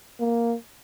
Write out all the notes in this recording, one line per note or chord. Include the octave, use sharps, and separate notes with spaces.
A#3